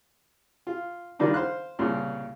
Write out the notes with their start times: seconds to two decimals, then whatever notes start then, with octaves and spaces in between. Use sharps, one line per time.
0.67 F4
1.19 D#3 G3 D4 D#4 F4
1.34 C5 F5 F#6
1.79 C2 A#2 C#3 C6